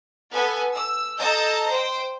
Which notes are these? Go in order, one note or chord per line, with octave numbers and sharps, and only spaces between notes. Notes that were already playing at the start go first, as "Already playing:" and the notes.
B3 A4 B4 G#5
E6
A4 D#5 A5 A#5 G6
C5 G5